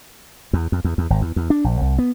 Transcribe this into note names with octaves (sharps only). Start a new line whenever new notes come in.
E2
F2
E2
E2
G#1
E2
E2
D4
A#1
C2
B3